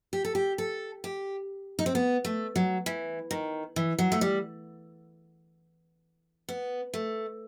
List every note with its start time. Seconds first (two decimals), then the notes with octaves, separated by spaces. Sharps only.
0.13 G4
0.25 A4
0.35 G4
0.58 A4
1.04 G4
1.79 D#4
1.86 C4
1.95 B3
2.25 A3
2.56 F#3
2.86 E3
3.31 D#3
3.76 E3
3.98 F#3
4.12 A3
4.21 G3
6.48 B3
6.94 A3